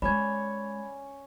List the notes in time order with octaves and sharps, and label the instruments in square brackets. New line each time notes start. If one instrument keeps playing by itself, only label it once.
[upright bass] G#3 [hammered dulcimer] C#4 C#5 [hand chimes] D5 [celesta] B5 G#6